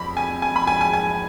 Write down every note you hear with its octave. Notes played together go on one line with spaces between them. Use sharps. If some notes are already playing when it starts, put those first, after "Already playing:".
Already playing: F2 F3 B5
G#5
G#5
B5
G#5
G#5
G#5